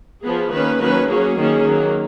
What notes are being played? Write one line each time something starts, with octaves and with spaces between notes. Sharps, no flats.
F3 B3 G#4
D#3 A#3 C#4 B4
D#3 F#3 A#3 C#4 B4
F#3 A#3 C#4 G#4
D#3 A#3 C#4
D#3 F#3 A#3